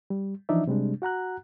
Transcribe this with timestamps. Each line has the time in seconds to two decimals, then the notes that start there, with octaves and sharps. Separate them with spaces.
0.10 G3
0.49 E3 F3 D4 D#4 D5 E5
0.67 C3 G3 G#3 D4
1.02 F#4 F#5 A#5 F#6